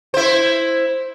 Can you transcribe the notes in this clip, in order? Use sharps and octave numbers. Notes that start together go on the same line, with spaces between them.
E4 C5